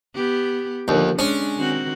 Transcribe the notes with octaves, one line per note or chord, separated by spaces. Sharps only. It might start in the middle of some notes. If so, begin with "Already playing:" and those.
B3 G4
D#2 D3 F3
G#3 C#4 D4
D#3 C4 F#4